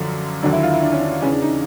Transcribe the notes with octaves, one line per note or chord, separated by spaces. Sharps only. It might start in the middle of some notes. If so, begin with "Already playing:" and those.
Already playing: F#2 D3 F3 D4
D#2 D3 F#3 D4
E4
F4
E4
D4
C#4
D4
E2 C#3 E3 C#4
D4
D#4